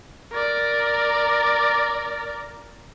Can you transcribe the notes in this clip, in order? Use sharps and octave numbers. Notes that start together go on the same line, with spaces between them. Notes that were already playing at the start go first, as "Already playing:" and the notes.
A#4 D5